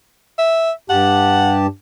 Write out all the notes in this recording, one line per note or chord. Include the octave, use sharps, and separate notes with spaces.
E5
G2 G4 F#5 A5